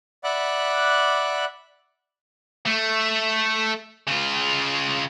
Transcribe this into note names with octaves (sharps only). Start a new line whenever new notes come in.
D5 E5 F#5 B5 D6 F#6
A3
C#3 F4